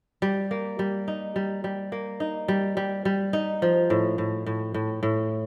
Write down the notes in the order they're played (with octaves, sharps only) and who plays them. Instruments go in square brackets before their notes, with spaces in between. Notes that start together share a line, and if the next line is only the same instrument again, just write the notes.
[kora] G3
A#3
G3
D#4
G3
G3
A#3
D#4
G3
G3
G3
D#4
F3
A2
A2
A2
A2
A2